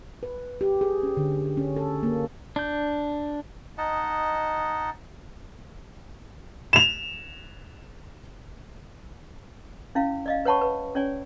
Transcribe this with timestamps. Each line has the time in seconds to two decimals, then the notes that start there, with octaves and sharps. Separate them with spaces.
0.23 B4
0.61 G4
0.81 G#4
1.03 C#4
1.17 D3
1.57 C#4
1.76 A4
2.03 A#3
2.56 D4 G6
3.78 D#4 D#5 F#5 A5
6.73 E7 F7
9.95 C#4 E4 F5
10.26 D5 D#5 F5
10.45 B4 C#5 F#5 A5 B5 C#6
10.61 B4
10.95 C#4 C#5 D5 G#5